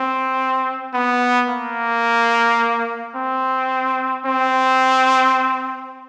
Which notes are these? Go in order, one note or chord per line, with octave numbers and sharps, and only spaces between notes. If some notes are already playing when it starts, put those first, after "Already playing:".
Already playing: C4
B3
A#3
C4
C4